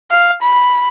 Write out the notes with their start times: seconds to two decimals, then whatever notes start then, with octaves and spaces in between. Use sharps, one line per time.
0.11 F5
0.42 B5